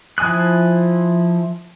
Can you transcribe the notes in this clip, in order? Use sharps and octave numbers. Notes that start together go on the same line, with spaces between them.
F3 E4 G#5 D#6 F#6